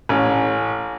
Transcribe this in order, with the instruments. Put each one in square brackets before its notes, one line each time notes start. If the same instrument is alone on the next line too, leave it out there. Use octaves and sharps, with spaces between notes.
[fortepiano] A1 C#4